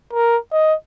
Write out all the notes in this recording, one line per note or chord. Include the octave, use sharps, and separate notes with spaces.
A#4
D#5